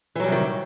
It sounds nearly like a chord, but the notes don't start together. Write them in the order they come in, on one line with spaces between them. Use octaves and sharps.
E3 F#3 G3 C3 D#3